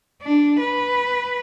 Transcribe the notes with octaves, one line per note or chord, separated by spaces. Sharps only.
D4
B4